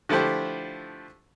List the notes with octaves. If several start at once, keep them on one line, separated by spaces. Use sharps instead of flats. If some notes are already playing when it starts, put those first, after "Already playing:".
D3 F3 A3 E4 G4 C5